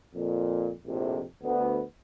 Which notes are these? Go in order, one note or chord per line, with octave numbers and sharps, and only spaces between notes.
F2 A#2
A#1 F2 A2 C3
D2 B3